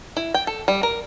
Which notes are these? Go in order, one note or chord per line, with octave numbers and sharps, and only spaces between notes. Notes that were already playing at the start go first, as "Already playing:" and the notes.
E4
G5
A4
G3
A#4